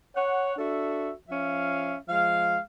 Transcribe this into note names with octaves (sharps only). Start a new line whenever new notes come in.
C#5 F#5
D4 F#4 A4 E5
F3 C#4 E5 F5
F3 G#3 F5